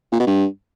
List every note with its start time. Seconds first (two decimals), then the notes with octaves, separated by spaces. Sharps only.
0.12 A#2
0.20 B2
0.27 G2